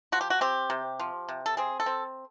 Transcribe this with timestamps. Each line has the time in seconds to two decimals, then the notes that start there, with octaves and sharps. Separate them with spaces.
0.12 F3 F#4
0.21 G4
0.30 F#4
0.41 C4 G4
0.70 C3
0.99 F3
1.28 C3
1.46 A4
1.57 C4 G#4
1.80 A4
1.86 C4